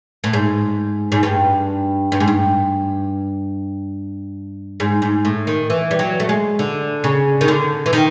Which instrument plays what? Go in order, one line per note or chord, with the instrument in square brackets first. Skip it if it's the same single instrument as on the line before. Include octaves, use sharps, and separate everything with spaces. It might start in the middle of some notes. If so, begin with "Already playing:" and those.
[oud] A2
G#2
G#2
G2
G2
G#2
G2
G#2
G#2
A2
D#3
E3
G3
F#3
A3
G#3
D3
C#3
D#3
D3
E3
D#3